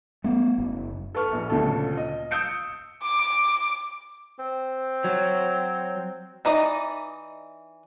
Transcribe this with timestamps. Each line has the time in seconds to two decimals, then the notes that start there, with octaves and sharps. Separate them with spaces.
0.24 A3 B3
0.58 F#1
1.15 A4 B4 C#6 F6
1.33 A#1
1.50 D2 A#2 C#3 A4
1.97 D#5
2.31 D#6 E6 G6 C#7 D7
3.03 D6
4.39 C4
5.04 F#3
6.45 E3 D#4 D5 D#5